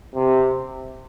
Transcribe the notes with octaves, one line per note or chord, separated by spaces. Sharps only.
C3